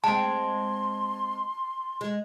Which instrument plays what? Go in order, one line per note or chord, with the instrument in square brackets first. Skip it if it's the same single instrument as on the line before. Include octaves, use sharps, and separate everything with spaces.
[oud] G#3 C4 [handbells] A5 [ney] C6
[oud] G#3